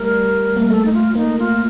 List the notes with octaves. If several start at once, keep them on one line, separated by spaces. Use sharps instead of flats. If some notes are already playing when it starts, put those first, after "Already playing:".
Already playing: G3 A3 A#4
A#3
A3 A4
D#4
F4
F4
A#3 D#4
F4